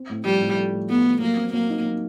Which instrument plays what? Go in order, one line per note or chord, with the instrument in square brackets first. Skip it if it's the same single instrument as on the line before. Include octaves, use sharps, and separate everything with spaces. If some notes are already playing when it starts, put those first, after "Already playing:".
Already playing: [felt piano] C4
A2
[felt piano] F3 [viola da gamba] G3
[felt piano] A2
A3
A2
[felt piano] A3 [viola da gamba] B3
[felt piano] A3
[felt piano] F#3 [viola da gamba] A#3
[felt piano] C4
[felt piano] F#3 [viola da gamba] A#3
[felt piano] D#4
F#3